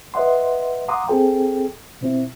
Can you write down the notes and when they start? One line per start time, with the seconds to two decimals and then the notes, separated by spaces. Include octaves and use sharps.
0.14 B4 D#5 E5 F#5 C6
0.88 F5 F#5 A#5 C6 D6 D#6
1.08 C4 G#4 A4 G5
2.01 B2 C4 E4